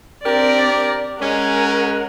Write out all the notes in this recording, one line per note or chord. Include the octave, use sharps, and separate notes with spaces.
C4 D4 G4 A#4 D5
G#3 C#4 A#4 F#5